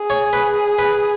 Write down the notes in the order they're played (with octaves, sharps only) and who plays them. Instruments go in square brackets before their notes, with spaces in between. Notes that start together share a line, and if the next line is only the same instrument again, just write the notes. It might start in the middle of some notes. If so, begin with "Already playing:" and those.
Already playing: [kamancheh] G#4
[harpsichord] C#5
B4
B4